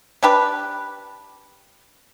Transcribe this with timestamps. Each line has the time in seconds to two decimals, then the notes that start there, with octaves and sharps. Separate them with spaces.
0.23 D4 G4 B4